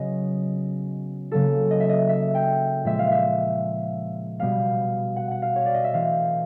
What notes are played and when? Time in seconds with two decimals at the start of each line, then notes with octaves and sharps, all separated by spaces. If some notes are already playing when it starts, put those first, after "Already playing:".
Already playing: C#3 F#3 B3 D#5
1.31 C#3 F#3 A#3 A4
1.71 D#5
1.80 E5
1.89 D#5
2.09 E5
2.35 G5
2.84 A#2 F3 G#3 E5
2.99 F5
3.11 E5
4.39 B2 G3 B3 F5
5.16 F#5
5.31 F#5
5.42 F5
5.56 C#5
5.66 D5
5.74 D#5
5.84 E5
5.93 E3 A3 C4 F5